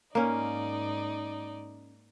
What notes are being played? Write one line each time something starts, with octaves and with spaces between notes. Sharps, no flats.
G#2 A#3 C#4 D#4 D5